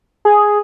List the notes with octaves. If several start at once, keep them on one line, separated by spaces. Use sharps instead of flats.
G#4